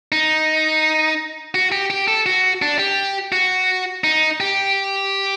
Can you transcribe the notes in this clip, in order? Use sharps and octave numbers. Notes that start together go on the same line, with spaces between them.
D#4
F#4
G4
G4
A4
F#4
D4
G4
F#4
D#4
G4